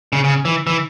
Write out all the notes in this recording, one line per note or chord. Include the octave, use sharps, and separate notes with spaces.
C#3
C#3
E3
E3